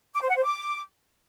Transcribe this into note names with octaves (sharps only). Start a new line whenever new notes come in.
D6
C5
F#5
C5
D6